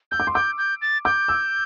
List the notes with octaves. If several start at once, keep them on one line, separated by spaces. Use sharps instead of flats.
E6 G6
D6
C6
D6 G6
G6
A6
D6 G6
E6